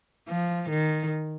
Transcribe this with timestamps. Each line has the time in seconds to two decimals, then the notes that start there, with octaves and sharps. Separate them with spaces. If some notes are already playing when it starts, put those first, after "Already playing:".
0.28 F3
0.70 D#3